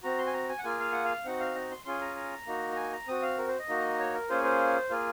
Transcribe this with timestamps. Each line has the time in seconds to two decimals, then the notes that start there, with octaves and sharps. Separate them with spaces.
0.03 C4 F#4 A#5
0.18 C6
0.27 G#5
0.33 A#5
0.49 G#5
0.58 F#5
0.64 A#3 F4 G#4 G#5
0.80 F5
0.92 F#5
1.04 F5
1.24 C4 D#4 F#4 F#5
1.40 F5
1.55 A#5
1.71 C6
1.85 C#4 F4 G#4 C6
2.01 A#5
2.16 A#5
2.47 A#3 D#4 F#4
2.72 A#5
2.76 G#5
2.92 A#5
3.08 C4 F#4 D#6
3.22 F5
3.38 A#4
3.47 C5
3.59 D#5
3.69 A#3 D#4 F#4
3.99 C#5
4.14 A#4
4.30 A#3 C#4 F4 G#4 C5
4.44 C5
4.90 A#3 F4 G#4